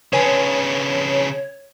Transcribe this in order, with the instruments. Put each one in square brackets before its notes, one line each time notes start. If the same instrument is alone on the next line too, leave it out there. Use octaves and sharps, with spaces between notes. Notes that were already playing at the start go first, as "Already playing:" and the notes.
[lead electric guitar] C#3 D4 [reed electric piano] B4 G#5 [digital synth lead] C#5